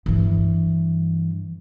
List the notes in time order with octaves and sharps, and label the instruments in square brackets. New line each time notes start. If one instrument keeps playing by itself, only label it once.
[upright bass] G2 E3